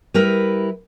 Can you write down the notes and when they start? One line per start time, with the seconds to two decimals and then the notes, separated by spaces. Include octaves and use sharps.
0.14 G3 E4 A#4 B4